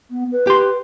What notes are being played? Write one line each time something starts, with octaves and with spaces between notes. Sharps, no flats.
B3
B4
G4 C6